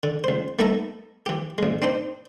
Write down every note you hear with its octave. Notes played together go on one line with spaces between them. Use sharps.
D3
C#2 C5
A3 B3 D#4 A4 E5 A#5
E3 G4
A1 G#3
C4 D4 D#4 C5